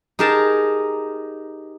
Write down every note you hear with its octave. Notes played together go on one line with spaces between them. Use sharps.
D#4 G4 G#4 A#4 A5